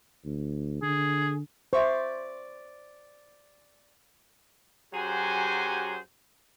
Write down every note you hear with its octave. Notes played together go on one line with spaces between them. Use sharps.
D2
D3 G#4
C5 D5 E5 C#6
F#2 F#3 G4 G#4 C5 G#5